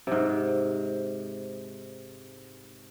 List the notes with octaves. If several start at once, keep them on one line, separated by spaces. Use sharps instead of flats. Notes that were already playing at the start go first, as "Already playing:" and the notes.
G#2 C3